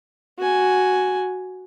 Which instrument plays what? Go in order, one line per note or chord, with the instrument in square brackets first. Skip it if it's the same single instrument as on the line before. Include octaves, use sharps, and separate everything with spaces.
[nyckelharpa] F#4 G#5